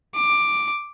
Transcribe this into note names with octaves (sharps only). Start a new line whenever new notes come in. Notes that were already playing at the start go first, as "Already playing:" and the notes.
D6